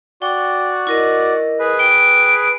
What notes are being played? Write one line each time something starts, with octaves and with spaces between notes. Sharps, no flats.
F#4 D5 G5
E4 A#4 D#5
G#4 B4
G5 D7